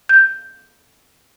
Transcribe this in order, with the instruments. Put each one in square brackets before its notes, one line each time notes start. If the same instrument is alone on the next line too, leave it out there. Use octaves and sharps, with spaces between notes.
[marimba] G6